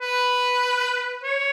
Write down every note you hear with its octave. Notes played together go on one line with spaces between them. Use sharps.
B4
C#5